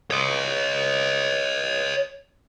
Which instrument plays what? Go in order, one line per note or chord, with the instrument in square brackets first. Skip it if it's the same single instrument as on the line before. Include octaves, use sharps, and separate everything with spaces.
[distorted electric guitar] C#5 D#5